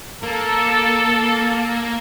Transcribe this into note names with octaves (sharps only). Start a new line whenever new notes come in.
A#3 A4